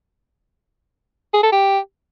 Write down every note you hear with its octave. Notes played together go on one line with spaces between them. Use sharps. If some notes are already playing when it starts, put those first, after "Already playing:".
G#4
A4
G4